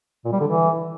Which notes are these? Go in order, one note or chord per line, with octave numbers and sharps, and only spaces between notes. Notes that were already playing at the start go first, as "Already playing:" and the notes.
A#2
G3
D3
E3